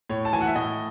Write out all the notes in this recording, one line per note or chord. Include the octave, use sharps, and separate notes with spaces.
A2 C#5
A5
E3 G#5
F#5
E5
A2 D#5